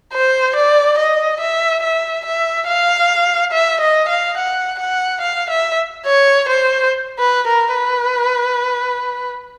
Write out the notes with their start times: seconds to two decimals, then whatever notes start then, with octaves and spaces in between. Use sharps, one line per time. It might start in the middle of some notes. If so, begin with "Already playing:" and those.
0.13 C5
0.56 D5
0.98 D#5
1.40 E5
1.83 E5
2.25 E5
2.68 F5
3.52 E5
3.81 D#5
4.09 F5
4.37 F#5
4.79 F#5
5.21 F5
5.50 E5
6.06 C#5
6.49 C5
7.19 B4
7.47 A#4
7.75 B4